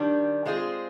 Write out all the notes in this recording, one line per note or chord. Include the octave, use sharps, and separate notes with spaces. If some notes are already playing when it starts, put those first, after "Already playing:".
Already playing: D#3 G3 D4
G#3 C4 F4 G#4